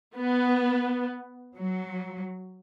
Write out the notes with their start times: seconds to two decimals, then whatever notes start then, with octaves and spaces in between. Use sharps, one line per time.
0.17 B3
1.55 F#3